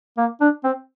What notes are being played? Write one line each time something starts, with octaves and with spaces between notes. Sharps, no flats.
A#3
D4
C4